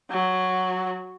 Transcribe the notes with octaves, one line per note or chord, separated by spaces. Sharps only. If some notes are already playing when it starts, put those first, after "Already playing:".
F#3